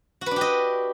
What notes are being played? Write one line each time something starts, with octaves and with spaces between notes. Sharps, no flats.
D4 F#4 G4 B4 D#5